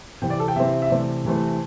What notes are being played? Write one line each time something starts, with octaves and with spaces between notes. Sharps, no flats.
C3 E3 C4 G5
D5
A4
G5
C3 E3 C4 E5
E5
C3 E3 A3 C4 D5
C3 E3 A3 C4